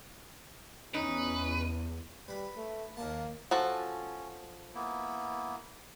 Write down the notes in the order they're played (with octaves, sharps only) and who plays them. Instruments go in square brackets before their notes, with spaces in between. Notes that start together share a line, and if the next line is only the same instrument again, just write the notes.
[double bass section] E2 [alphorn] C#4 [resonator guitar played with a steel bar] D#4 [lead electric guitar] B4
[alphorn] G3 [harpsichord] B4
[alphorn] A3
[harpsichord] D#2 A5 [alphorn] A#3
[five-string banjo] F3 F#4 A4 [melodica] C#4
[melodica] A#3 B3 E4